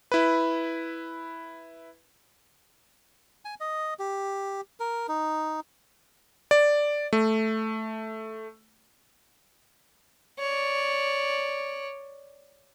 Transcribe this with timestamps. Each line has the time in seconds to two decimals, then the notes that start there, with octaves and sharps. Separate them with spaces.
0.12 E4 B4
3.45 G#5
3.60 D#5
3.99 G4
4.80 A#4
5.08 D#4
6.51 D5
7.13 A3
10.39 C#5 D5